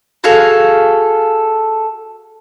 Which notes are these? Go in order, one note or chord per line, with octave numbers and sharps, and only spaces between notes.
F#4 G#4 A4 F5